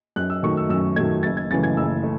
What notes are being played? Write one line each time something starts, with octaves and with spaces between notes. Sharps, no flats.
F#2 F#6
E6
D#3 F#3 A3 C#6
E6
F#2 E6
D#3 F#3 A3 G#6
F#1 A6
G#6
F#2 C#3 E3 A3 A6
G#6
F#1 E6
A3